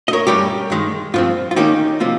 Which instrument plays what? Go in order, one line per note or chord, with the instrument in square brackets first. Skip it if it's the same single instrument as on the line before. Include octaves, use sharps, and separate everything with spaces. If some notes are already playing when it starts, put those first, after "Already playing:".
[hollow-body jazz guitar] D#5
A#4 C#5
G2 G3 C#4 G4 A#4
G2 D#3 G#3
G2 F3 C4 F4
F4
D#2 D#3 A#3 C#4 D#4 G4
C3 F3 A#3 F4